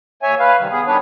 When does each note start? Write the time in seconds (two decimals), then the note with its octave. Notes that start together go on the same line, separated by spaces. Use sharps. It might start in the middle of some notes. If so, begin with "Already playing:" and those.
0.23 D#2 C#5 E5 G#5
0.39 B4 F5
0.59 C3 D#3 G3
0.72 B3 G#4
0.87 D#3 G3 B3 D4 B4 C#5